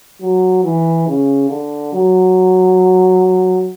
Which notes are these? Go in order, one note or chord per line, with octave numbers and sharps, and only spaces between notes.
F#3
E3
C#3
D3
F#3